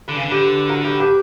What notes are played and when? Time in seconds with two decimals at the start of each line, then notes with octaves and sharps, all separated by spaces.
0.08 D3 B4
0.15 C#3
0.23 D3
0.31 G4 B4
0.69 F#4 A#4
0.84 G4 B4
1.00 G4 B4